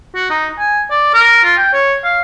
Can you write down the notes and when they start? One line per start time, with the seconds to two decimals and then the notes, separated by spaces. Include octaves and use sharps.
0.15 F#4
0.30 D#4
0.59 G#5
0.90 D5
1.14 A#4
1.44 F4
1.58 G5
1.73 C#5
2.04 F5